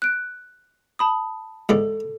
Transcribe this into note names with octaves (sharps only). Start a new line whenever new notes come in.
F#6 D7
A5 B5 D#6
G#2 E3 A4 D5